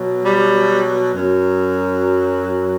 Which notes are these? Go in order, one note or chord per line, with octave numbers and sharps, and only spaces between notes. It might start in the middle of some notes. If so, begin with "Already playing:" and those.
Already playing: B2 F#3
G3
F#2 F#3